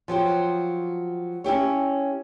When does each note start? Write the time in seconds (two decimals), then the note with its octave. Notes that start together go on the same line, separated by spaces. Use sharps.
0.08 F3 F#3 G4 C5
1.44 C#4 E4 G4 C#5